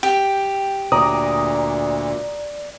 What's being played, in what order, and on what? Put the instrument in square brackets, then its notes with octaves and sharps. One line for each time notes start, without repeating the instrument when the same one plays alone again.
[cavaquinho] G4 [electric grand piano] G5
[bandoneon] D2 A#2 [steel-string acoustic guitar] D5 [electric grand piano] A#5 D#6